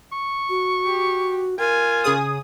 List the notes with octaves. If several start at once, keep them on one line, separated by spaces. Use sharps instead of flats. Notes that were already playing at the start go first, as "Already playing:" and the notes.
C#6
F#4
G4
F4 A#4 G#5
C#3 G#4 D#6